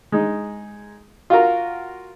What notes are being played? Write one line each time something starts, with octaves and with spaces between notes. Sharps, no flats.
G#3 D#4
F4 F#4 A#4